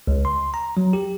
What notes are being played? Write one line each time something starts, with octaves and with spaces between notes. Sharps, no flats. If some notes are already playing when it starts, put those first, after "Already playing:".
C#2
C6
A#5
F#3
G4